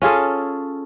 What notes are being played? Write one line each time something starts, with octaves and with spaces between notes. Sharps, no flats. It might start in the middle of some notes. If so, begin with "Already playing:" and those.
C#4 F4 G#4 A4